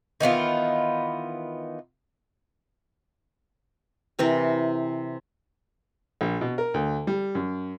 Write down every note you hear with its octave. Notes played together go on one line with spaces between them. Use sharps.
D#3 E3 B3 F4
C3 E3 C4 A#4
A#1
B2
A#4
D2
G3
F#2